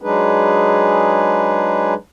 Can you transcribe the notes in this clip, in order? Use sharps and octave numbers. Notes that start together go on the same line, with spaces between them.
F#3 G#3 D4 D#4 G#4 B4